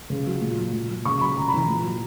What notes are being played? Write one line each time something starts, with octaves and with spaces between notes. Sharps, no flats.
C#3
F#3
A#2
F#3
A#2
F#3
C#3 C#6
F#3 B5
C#3 A#5
B5
E3 A#5
A#2
F#3